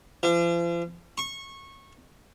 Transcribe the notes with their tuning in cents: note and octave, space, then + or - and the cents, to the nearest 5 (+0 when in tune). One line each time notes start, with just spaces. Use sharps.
F3 -40
C#6 -20